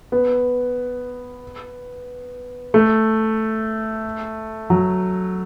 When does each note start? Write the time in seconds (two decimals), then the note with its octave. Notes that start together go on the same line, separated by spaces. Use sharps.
0.12 B3
2.74 A3
4.70 F#3